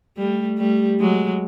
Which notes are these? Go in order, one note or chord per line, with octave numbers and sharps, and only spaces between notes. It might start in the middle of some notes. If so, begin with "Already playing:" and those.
G3 A3
G3 A3
F#3 G#3